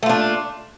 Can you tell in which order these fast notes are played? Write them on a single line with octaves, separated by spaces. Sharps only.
A3 F4 D4